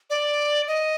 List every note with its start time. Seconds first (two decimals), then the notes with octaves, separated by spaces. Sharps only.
0.10 D5
0.67 D#5